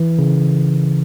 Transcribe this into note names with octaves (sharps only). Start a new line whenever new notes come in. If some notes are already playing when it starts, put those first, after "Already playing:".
Already playing: E3
C#3